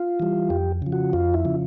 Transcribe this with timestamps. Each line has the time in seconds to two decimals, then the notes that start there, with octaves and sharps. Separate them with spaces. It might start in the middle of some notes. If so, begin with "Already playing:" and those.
Already playing: F4
0.20 E3 G3
0.50 F2 G4
0.82 C#3 F3
0.92 F#4
1.13 F2 F4
1.34 E4
1.45 C#3 F3